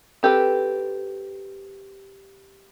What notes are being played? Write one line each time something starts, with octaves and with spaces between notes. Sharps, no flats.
C4 G4 A4 B4